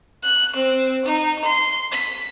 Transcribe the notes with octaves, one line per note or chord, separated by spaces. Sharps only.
F#6
C4
D#4
C6
B6